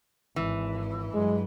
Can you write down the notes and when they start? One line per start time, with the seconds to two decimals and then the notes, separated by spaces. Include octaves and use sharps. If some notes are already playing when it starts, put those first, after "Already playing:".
0.36 G#1 E3
1.14 G2 F#3 G#3